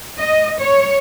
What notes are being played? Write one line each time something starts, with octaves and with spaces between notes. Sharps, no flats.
D#5
C#5